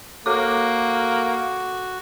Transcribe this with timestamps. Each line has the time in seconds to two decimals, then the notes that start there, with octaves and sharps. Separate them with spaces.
0.26 A#3 F#4 A4 D6